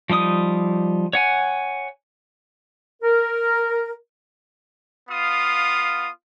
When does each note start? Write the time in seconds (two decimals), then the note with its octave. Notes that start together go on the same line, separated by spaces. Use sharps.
0.10 F3 G3 D#4 D#6
1.13 C#5 F#5 G#5
3.02 A#4
5.09 B3 F4 F5 D#6